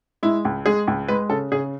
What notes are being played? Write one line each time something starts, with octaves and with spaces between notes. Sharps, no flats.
G#3 E4
C#2
G#3 G#4
C#2
G#3 B4
C#3 A4
C#3 G#4